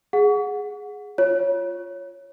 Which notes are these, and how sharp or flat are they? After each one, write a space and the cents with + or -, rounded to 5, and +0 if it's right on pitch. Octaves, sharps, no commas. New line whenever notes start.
G#4 +0 F#5 -20
F4 +0 C#5 +0